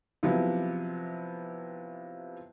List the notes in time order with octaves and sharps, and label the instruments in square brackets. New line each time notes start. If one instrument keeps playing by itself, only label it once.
[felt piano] C3 F3 F#3 B3 E4